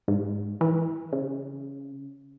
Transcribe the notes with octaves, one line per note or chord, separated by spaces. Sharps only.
G#2
E3
C#3